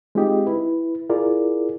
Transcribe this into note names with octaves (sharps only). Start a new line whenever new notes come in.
G#3 C4 D#4 F4 G4 D#5
E4 B4
E4 F4 G#4 A#4 D5